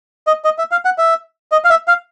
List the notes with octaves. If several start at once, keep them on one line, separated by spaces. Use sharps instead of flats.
D#5
D#5
E5
F5
F#5
E5
D#5
F5
E5
F5